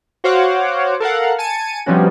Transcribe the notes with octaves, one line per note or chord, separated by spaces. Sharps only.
F#4 C5 C#5 F5 F#5 D6
A4 A#4 F5 F#5
G#5 A5 C#7 D#7
C3 F3 G3 B3 C#4 F#4